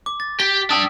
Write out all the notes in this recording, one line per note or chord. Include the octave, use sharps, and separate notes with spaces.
D6
A6
G4 B6
D4 G5 A5 D#6 E6